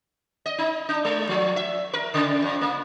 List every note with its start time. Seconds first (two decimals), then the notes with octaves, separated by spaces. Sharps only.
0.46 D#5
0.58 D#4
0.89 D4
1.05 G#3
1.29 F3
1.56 E5
1.93 A#4
2.14 C#3
2.42 F2
2.61 A#3